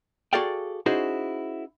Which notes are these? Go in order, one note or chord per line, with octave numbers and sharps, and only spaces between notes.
F#4 G#4 A4 D5 F5 G5
C#4 D#4 E4 F#4 G#4 C5